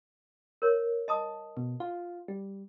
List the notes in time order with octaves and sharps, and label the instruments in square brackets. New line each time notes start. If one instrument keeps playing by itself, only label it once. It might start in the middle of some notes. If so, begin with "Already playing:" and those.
[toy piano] A#4 C#5
D#5 A5 D#6
[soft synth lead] B2
F4
G3